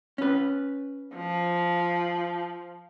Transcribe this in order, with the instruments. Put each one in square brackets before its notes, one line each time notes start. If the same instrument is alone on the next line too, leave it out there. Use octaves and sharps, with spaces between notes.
[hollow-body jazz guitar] C#4 B4
[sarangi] F3